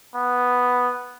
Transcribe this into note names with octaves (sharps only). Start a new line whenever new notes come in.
B3